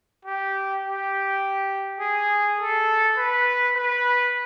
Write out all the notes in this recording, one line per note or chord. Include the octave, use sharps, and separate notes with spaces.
G4
G4
G#4
A4
B4
B4